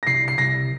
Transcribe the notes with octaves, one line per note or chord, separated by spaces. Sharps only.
A#6
C2 C7
C7
C2 A#6